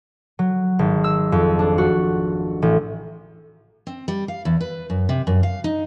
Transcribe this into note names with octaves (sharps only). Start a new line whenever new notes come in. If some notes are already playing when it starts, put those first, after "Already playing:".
F#3
G#1
E6
F2
D4
F#4
A1
C4
G3
F5
E2
B4
F#2
C3
F#2
F5
D#4